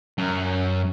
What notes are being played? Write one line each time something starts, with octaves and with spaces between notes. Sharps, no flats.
F#2